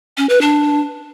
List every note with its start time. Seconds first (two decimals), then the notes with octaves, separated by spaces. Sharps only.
0.17 C#4
0.29 B4
0.41 D4